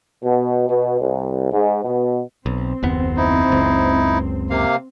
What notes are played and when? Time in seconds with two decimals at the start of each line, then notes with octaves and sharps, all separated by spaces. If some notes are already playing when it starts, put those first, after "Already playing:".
0.23 B2
0.68 B2
0.99 C2
1.52 G#2
1.83 B2
2.46 B1 C4
2.83 F#1 D#2 B3
3.17 D#4 E4
3.48 F#1 C#2
4.50 C3 A#3 F5